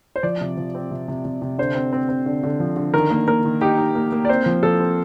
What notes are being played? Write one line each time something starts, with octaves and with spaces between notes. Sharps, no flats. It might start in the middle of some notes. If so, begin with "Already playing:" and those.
C5
F3 D5
C3
F3
C4
C3
C3
C3
C3
D3 C5
C4
C4
C4
D3
D3
F3
D3
D#3 A#4
A#3
A#3 A#4
D#3
D#4 G4
D#4
A#3
A#3
D5
C4 C5
F3
F3 A4
C4